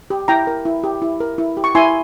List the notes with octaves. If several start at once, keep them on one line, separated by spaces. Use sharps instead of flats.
G4
E4 G5 A#5
A#4
E4
G4
E4
A#4
E4
G4
C#6
E4 G#5 C6